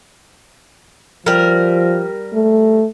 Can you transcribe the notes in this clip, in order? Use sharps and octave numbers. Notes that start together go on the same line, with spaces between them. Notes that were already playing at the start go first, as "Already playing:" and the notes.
F3 G3 A#4
A3